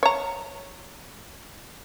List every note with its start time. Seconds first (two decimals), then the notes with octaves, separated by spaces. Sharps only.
0.03 C#5 A#5